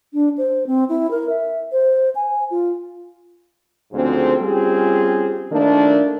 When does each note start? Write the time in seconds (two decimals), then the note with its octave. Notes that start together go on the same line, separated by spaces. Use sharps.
0.13 D4
0.38 C5
0.67 C4
0.89 E4
1.11 A#4
1.30 E5
1.72 C5
2.15 G#5
2.51 F4
3.92 D2 G#2 C#3 F3 C4
4.41 G3 C4 C#4 F4 G4 G#4
5.51 D#3 F3 A3 A#3 D4